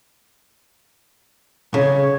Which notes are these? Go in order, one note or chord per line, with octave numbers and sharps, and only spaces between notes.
C#3 C#5